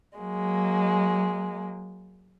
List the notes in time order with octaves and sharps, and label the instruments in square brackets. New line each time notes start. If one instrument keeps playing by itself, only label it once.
[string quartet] F#3 G#3 A#3